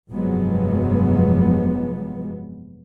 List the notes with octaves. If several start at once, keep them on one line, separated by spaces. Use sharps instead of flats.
F1 G2 F3 F#3 G#3 B3